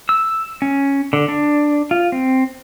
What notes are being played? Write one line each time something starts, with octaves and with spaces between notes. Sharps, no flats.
E6
C#4
D3
D4
F4
C4